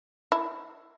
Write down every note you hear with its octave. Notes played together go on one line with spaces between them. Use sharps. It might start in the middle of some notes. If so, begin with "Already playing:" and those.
E4